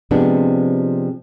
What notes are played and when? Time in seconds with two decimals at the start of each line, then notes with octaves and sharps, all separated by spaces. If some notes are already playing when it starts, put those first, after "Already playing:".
0.11 C3 F3 G#3 B3 C4 D4